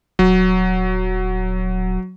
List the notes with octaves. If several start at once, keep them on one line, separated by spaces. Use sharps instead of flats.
D#1 F#3